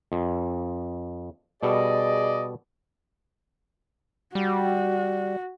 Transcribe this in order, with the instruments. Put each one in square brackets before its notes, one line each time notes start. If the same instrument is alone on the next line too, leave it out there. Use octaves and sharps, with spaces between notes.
[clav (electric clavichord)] F2
[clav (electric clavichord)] B2 G3 A4 [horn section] G#4 D5 D#5
[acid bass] G3 [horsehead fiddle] F#4